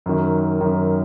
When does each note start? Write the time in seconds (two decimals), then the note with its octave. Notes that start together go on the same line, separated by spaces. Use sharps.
0.06 F#2 D#3
0.61 F#2 D#3